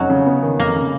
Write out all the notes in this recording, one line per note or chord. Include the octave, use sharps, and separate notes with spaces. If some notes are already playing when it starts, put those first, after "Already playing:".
Already playing: F1 F#3 C#4 D#4
C#3
B3
D#3
F1 A#3
C#3